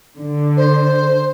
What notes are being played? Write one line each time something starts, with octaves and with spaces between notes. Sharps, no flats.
D3
C5